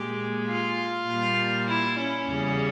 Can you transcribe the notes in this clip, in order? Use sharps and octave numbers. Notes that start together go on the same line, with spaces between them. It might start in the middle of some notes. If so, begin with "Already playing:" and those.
Already playing: A#2 G#3 G4
F4
A#2 G3
E4
C#4
E2 C#3 G3